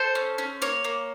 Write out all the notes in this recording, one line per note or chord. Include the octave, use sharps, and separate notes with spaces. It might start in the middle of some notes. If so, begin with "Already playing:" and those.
Already playing: A4 C5
C#4
C#4
A#3 C#5
A#3